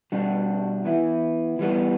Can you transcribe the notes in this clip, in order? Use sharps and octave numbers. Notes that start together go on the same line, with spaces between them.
B2 G3 D4 F#4
E3 B3 E4
E3 G3 B3